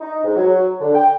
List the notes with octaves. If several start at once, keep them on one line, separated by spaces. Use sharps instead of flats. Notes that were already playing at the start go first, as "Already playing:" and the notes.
D#4
G#2
F#3
D3
G5